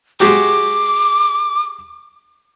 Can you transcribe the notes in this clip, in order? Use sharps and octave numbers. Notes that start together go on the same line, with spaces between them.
G#3 F#4 G4 D6